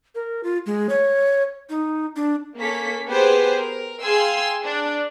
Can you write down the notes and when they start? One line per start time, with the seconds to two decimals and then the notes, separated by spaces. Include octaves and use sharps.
0.15 A#4
0.43 F4
0.66 G#3
0.89 C#5
1.70 D#4
2.16 D4
2.57 A#3 C#4 A4 B6
3.08 B3 G4 G#4 B4 C5
3.57 A#4
4.02 G#4 F5 G5 G#5 C6 E6
4.64 D4